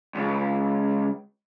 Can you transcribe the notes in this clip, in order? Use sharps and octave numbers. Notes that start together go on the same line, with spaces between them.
C#2